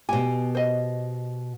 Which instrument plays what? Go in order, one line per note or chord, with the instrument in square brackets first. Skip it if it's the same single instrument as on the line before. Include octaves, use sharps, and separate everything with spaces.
[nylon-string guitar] B2 G4 [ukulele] G#5
[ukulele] C5 D#5